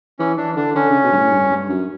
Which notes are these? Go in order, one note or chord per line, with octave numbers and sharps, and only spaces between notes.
E3 C#4
E3 D4
D3 D4
D3 C#4
C#3
B2
G2
A2
G2
G2
F#2